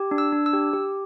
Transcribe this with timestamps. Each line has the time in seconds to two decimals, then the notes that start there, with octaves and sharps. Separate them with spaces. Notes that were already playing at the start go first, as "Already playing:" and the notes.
Already playing: G4
0.11 D4
0.18 E6
0.32 D4
0.46 E6
0.53 G4
0.73 G4